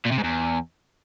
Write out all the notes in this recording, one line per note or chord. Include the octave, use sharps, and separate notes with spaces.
A#2
C3
G#2
E2